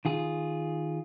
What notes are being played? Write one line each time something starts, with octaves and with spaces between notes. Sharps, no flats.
D#3 F4 G#4